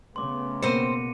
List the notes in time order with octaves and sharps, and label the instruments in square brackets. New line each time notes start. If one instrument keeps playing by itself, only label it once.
[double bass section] C#3 A3 B3 [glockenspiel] C6 D6
[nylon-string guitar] B2 A#3 [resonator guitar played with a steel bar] C4 C5 [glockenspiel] C#7 D#7